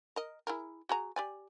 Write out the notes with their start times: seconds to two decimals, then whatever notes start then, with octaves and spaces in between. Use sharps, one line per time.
0.16 A#4 D#5
0.47 E4 G#4 A#4
0.89 F#4 G#4 A#5
1.16 G4 D5 G#5